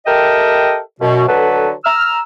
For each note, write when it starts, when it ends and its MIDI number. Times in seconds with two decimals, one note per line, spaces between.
0.06 0.79 67
0.06 0.79 69
0.06 0.79 70
0.06 0.79 75
0.06 0.79 76
0.06 0.79 79
1.01 1.27 42
1.01 1.27 47
1.28 1.72 50
1.28 1.72 54
1.28 1.72 69
1.28 1.72 71
1.85 2.20 82
1.85 2.20 88
1.85 2.20 89